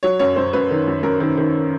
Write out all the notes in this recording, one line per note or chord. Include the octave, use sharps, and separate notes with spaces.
F#3 C#5
F#2 C#5
F#2 C5
F#2 B4
D#3
F#2
F#2 A#4
D#3
D#3